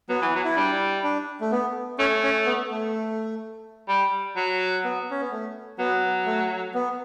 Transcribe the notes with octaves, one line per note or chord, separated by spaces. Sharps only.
F#3 B3
E3
F#3
E4
G3 D4
D4
A3
B3
A3 C#4
C#4
B3
A3
G3
F#3
B3
C#4
B3
A3
F#3 B3
A3
B3